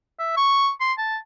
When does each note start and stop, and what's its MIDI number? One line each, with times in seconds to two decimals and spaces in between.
0.19 0.35 76
0.37 0.71 85
0.80 0.93 84
0.98 1.17 81